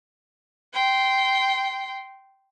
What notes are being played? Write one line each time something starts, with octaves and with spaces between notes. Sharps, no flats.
G5 C6